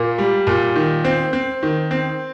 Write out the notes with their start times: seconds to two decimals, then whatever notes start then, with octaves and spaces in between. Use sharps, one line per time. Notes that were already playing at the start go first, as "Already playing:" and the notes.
Already playing: A#2 A#3
0.18 G3
0.47 A#2
0.76 D#3
1.04 C4
1.33 C4
1.63 D#3
1.91 C4